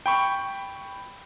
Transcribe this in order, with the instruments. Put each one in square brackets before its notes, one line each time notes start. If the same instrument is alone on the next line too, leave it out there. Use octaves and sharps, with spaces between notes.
[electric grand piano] G5 B5 C#6